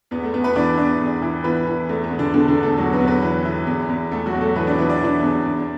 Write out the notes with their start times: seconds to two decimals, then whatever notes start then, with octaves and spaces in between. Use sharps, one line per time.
0.11 E2 B3
0.23 A3
0.34 E2 B3
0.44 B3 B4
0.56 E3 D4 D5
0.77 E2 D4 D5
1.01 E2
1.22 E3
1.44 E3 B3 B4
1.67 E3
1.89 E2 A3
2.04 B3
2.11 E2
2.19 D3 D4
2.33 E2 D3 D4
2.48 D3 D4
2.57 E2
2.63 A3 A4
2.78 E2 F#3 F#4
2.93 B3 B4
3.01 E2
3.08 B3 B4
3.23 E3
3.45 E3
3.67 E2
3.89 E2
4.11 E2 A3 A4
4.26 F#3 F#4
4.34 E2
4.41 A3 A4
4.56 E3 B3 B4
4.67 D4 D5
4.78 E3 B3 B4
4.90 D5
5.01 E3 D4 D5
5.22 E2
5.45 E2